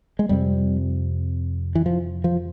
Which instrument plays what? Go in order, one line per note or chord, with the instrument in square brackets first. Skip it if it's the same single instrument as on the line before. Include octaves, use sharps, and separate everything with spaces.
[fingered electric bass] G#3
F2 C3 G3
E3
F3
F3